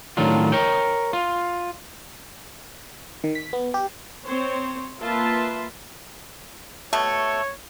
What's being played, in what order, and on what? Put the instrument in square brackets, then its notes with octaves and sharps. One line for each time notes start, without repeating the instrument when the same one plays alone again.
[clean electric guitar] A2 D#3 F#3 D4 F4
A#4 C#5 G5
F4
[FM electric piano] D#3
B6
B3
G4
[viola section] C4 C5 C#5
A#3 F4 B4 E5 A5 C6
[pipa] B2 A3 [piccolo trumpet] C#5